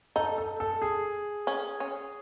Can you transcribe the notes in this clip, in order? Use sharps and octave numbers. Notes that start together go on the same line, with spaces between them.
D#4 A4
A4
A4
G#4
C#4
C#4